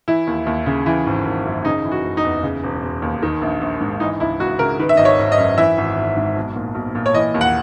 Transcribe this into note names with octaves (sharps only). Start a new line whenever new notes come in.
E3 E4
D#2
D#2
C#3
E3
G#1
G#1
F#2
C#3 D#4
E3
F#4
F#1
D#4
E2
C#3
E1
E1
D#2
D#3
A#1
A#1
G#2
E3 D#4
C#2 E4
C#2 F#4
C#3 A#4
D#3 B4
E5
G#1 D#5
C#5
G#1
D#5
F#2
E3 E5
G#1
G#1
G#2
B1
A#2
B1
A#2
C#5
E3 D#5
D#2
F#5